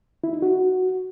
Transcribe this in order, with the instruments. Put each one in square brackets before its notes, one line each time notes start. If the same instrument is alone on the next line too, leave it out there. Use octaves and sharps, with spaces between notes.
[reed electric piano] E4
D#4
F#4